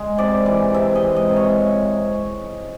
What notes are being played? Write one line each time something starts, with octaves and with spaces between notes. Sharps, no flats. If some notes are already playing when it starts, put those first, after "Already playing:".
Already playing: G#3
C3 D5
E3
C3 E5
D#5
G#3
D#5
C3
C#5